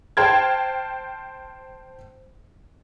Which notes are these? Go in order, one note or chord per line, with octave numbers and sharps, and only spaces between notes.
C5 G5 A5 F6 G#6